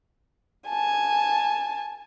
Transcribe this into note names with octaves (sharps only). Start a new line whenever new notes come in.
G#5 A5